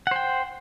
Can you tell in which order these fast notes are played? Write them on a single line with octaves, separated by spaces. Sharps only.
F#5 C5 G5